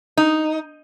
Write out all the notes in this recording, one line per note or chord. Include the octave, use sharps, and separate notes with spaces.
D#4